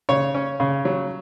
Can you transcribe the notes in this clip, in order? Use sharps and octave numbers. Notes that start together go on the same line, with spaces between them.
C#3 C#5
C#4
C#3
F#3